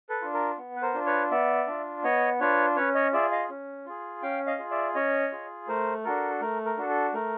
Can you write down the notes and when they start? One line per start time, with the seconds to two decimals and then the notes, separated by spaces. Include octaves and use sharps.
0.09 A4 B4
0.22 D4 F4
0.34 A#4
0.58 B3
0.76 B4
0.82 A#4 C5
0.94 D4 F4
1.06 B4 C#5
1.31 B3 D5 E5
1.67 D4 F4
2.04 B3 C#5 D#5
2.40 D4 F4 B4 C#5
2.76 C#4 B4 C#5
2.95 C#5 D#5
3.13 F4 G#4 D5 E5
3.31 D#5 F5
3.49 C#4
3.86 F4 G#4
4.22 C#4 F5 G5
4.47 D#5 F5
4.59 F4 G#4
4.71 D5 E5
4.95 C#4 C#5 D#5
5.32 F4 G#4
5.68 A3 A#4 C5
6.04 D4 F#4 A4 A#4
6.41 A3 A#4
6.65 A#4
6.78 D4 F#4 A4
6.89 A4
7.14 A3 A#4